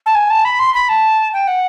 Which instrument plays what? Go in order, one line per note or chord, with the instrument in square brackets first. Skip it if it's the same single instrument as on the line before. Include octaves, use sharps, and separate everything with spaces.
[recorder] A5
G#5
A5
B5
C6
B5
A5
G5
F#5